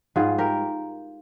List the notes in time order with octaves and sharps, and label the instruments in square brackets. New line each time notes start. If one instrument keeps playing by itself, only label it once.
[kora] G#2 G3 F4 G#4
G4 A#4